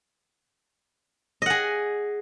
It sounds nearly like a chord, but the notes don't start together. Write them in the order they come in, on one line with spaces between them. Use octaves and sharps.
D#5 F#5 G#4